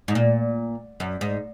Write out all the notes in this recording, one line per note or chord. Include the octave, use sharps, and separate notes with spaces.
G#2
A#2
F#2
G#2